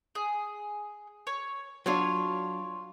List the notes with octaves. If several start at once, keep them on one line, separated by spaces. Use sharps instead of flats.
G#4
C#5
F#3 D4 F4 C#5